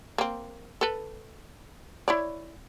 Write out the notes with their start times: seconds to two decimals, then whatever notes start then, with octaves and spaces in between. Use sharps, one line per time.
0.18 A#3 C4
0.81 A4 B4
2.08 E4 C#5 D5